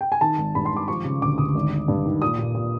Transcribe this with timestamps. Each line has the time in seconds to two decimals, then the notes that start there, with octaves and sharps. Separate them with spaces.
0.01 G5
0.12 G#5
0.21 D#3 A5
0.38 G#1
0.55 G2 B5
0.65 C6
0.72 G#1 D6
0.88 F3 C#6
1.05 C#3
1.22 D2 D6
1.38 D2 D#6
1.55 G#1
1.72 D#3
1.88 G2
2.05 D#3
2.22 A#2 D#6
2.38 A#2
2.55 A#2